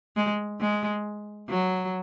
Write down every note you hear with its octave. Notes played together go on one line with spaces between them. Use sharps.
G#3
G#3
F#3